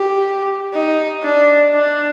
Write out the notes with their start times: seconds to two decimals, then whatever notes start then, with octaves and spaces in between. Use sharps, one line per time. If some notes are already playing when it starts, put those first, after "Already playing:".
Already playing: G4
0.73 D#4
1.23 D4
1.73 D4